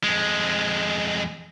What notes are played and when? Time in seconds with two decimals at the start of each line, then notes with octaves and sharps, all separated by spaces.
0.04 F2 G#3